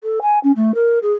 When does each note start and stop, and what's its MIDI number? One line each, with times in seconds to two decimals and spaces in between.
0.03 0.19 69
0.22 0.39 80
0.44 0.52 61
0.56 0.75 57
0.75 0.99 70
1.02 1.13 68